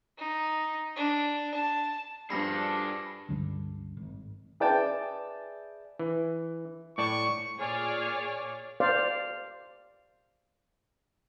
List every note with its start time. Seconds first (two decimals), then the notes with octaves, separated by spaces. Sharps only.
0.17 D#4
0.96 D4
1.54 A5
2.30 G2 F3 G3 D4 G#4 A4 B5 A#6
3.29 C#2 G2 D3 G3
3.97 G#1
4.60 G#4 B4 D5 E5 G5 A5
5.99 E3
6.98 A2 D5 A5 C#6
7.57 A#2 G#4 C#5 D5 F6
8.80 C5 D5 F5